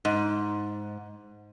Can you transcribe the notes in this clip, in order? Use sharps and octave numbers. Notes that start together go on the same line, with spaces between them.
G#2